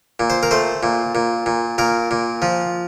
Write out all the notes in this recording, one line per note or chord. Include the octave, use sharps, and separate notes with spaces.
A#2
C5
A#4
A3 C5
A#2
A#2
A#2
A#2 A#4
A#2
F3